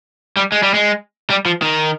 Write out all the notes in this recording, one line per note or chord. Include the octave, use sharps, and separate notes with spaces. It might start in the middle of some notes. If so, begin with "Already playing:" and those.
G3
G#3
G3
G#3
G3
F3
D#3